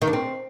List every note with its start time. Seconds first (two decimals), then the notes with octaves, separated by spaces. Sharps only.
0.02 D#3
0.07 D4
0.13 C4